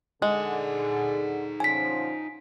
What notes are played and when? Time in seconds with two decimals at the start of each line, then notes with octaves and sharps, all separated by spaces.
0.22 D3 G#3 D#4 G#4 F#5
1.60 D3 F3 C#4 G#5 B6